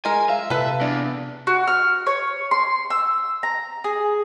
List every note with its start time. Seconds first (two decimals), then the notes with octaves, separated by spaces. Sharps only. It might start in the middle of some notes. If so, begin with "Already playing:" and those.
0.05 G#3 A#4 G#5
0.29 E5 F5
0.50 C3 A4 B4
0.81 E2 D4
1.47 F#4
1.68 F6
2.07 C#5
2.51 C6
2.90 E6
3.43 A#5
3.84 G#4